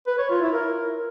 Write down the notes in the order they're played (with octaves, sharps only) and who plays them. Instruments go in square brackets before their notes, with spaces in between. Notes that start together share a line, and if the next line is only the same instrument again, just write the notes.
[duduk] B4
C#5
F4
E4
A#4